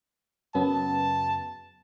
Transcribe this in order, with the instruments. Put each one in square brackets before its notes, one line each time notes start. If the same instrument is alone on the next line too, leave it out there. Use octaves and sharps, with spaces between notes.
[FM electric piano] F#2 C#3 B3 [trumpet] A5